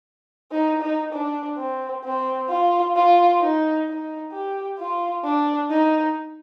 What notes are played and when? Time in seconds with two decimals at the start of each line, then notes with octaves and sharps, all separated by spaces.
0.52 D#4
0.82 D#4
1.13 D4
1.58 C4
2.04 C4
2.50 F4
2.96 F4
3.42 D#4
3.87 D#4
4.32 G4
4.79 F4
5.25 D4
5.70 D#4